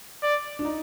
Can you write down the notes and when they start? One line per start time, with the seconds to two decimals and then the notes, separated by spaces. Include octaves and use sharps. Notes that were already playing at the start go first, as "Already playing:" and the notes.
0.23 D5
0.59 D4
0.65 D#4